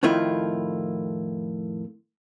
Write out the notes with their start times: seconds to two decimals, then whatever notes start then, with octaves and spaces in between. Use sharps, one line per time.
0.03 F2 A2 D#3 A3 E4 F4